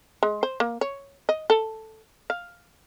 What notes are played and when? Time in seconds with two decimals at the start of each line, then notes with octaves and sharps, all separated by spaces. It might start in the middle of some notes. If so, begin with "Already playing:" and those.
0.23 G#3
0.43 C5
0.60 A#3
0.81 C#5
1.29 D#5
1.50 A4
2.30 F5